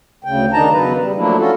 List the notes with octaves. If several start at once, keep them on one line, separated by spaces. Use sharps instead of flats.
D2 C#3 G5
D#3 D4 D#4 A5 A#5
E2 C#3 F#3 B4
G3
F3 F#3 A3 A#3 D4 E4
C#4 F4 F#4 A4